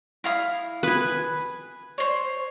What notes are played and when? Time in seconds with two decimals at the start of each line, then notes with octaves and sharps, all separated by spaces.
0.24 E4 F5 D#6
0.83 B4 G#5 B5 D#6
1.98 C5 C#5